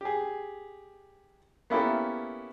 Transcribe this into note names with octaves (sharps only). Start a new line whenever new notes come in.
G4 G#4
A#3 B3 C#4 E4 G4 A4